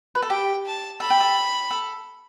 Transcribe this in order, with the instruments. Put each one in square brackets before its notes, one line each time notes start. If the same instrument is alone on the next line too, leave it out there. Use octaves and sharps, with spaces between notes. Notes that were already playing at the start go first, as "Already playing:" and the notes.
[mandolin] B4
A4
[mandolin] G4 [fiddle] G5
[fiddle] A5
[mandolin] A4 [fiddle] B5
[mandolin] G4
A4
A4